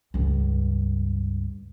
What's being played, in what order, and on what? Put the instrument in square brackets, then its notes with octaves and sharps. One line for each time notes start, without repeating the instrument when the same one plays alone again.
[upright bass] C#2 G2